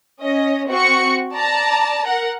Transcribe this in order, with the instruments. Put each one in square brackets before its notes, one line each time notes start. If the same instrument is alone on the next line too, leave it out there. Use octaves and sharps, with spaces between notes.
[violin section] C#4 D#5
C4 F#4 C#6 C#7
D5 A5 A#5
A#4 F#5